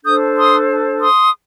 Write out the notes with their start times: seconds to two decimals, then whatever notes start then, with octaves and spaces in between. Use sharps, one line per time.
0.03 D4 A4 C5 D#6 G6
0.37 C6 D#6
1.00 C6 D#6